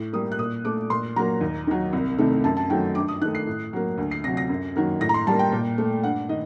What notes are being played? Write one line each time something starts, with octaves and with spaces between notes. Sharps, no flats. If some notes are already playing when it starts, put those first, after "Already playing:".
Already playing: A2
G3 A#3 D#6
F#6
A#2 D#6
A3 D6
A#2 C6
F#3 A#3 A#5
D#2
D#3 F#3
C2
C3 D#3 A3
F#2 A5
A5
D#3 F#3 A3 G5
G2 D6
D#6
D#3 A3 F#6
C7
A2
F#3 A#3
D2
C7
C3 F#3 A#6
A#6
F#2
D#3 F#3 A#3
A2 A#6
A#5
C6
G3 A#3 A5
G5
A#2
A3
G2 F#5
D#3 D#5